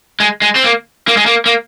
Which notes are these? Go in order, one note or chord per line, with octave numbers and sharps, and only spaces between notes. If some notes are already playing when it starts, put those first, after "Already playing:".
G#3
G#3
C4
A#3
A#3
G#3
A#3
A#3